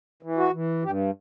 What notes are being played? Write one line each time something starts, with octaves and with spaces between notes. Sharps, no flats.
E3
F#4
E3
G2 G4